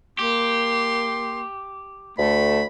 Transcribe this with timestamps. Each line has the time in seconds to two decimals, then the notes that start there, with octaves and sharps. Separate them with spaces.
0.19 A#3 G4 C6
2.18 D2 A3 B5